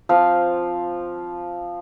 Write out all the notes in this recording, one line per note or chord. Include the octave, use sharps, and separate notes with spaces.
F3 C4 F5